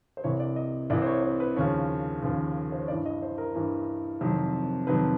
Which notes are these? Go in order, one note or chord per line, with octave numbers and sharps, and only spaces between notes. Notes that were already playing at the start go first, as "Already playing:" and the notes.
C5
C2 C3 E3 C#5
D5
D#5
C2 C3 E3 D5
C5
C#5
C5
B4
D#2 C#3 F3 C#5
D#2 C#3 F3
C5
C#5
G2 E3 D5
D#5
C5
A#4
G2 E3
F2 C3 D#3 F#3
F2 C3 D#3 F#3 B4